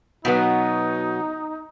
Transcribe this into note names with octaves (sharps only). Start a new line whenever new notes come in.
B2 F#3 B3 D#4